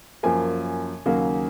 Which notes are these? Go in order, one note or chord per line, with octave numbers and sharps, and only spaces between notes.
F#2 F3 A#3 G#5
D#2 C#3 F#3 A#3